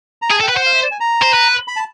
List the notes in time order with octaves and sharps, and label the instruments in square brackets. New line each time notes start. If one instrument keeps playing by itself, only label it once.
[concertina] A#5
[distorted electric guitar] G#4 [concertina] A5
[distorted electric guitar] A4 [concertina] G5
[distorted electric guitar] B4
[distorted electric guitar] C5 [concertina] F#5
[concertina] F5
E5
D5
G#5
A#5
[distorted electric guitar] C5
B4
[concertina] B5
A5